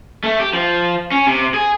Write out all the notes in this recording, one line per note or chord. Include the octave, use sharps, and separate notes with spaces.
A3
G4
F3
C#4
C3
G#4